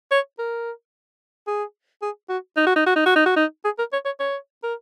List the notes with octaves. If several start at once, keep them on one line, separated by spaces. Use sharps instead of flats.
C#5
A#4
G#4
G#4
F#4
D#4
F#4
D#4
F#4
D#4
F#4
D#4
F#4
D#4
G#4
A#4
C#5
C#5
C#5
A#4